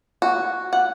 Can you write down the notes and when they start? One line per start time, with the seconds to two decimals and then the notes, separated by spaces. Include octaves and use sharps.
0.22 F#4
0.73 F#5